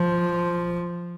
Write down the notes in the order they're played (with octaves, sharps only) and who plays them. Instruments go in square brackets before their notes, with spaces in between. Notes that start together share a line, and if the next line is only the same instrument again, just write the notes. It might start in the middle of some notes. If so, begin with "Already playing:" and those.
Already playing: [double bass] F3